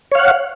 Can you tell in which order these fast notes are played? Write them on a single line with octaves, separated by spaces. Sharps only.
C#5 F5 F#5